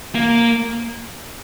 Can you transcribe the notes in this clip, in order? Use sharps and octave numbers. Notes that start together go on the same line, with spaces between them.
A#3